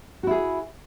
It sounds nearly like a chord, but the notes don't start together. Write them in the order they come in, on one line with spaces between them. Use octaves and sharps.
F#4 E4 G#4